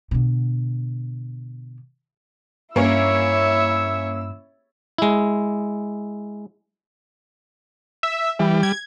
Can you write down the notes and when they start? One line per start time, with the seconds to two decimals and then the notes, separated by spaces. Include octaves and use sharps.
0.11 B2 D3
2.76 G2 A#3 C#4 E4 C#5 E5 E6
4.98 G#3 E4
8.03 E5
8.39 E3 G3
8.63 G#6